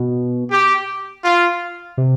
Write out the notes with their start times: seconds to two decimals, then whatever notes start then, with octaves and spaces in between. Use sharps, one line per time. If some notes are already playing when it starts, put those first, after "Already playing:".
Already playing: B2
0.51 G4
1.25 F4
1.98 C3